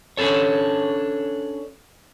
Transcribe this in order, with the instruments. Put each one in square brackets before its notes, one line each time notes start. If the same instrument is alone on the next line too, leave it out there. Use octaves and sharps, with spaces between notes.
[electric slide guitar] C#4 D4 A4 C#5